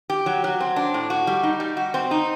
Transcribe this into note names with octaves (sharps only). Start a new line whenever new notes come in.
G4
F#3
F#3
C4
D4
A2
F#4
G3
D#4
G3
F#4
C4
D#4